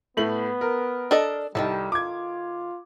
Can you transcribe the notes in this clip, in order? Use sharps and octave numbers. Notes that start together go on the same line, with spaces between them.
A2 A3 B3 F#7
A#4
D4 A4 D#5
C2 D#3 F#3 G3 A4
F4 D6 G#6